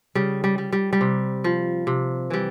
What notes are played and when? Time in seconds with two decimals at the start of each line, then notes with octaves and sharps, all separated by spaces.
0.15 C#3 G3
0.44 G3
0.58 G3
0.72 G3
0.93 G3
1.01 C3
1.44 F3
1.87 C3
2.30 E3 G3